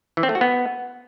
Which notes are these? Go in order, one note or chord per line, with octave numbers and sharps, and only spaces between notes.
E3
C4
A3
F#4
B3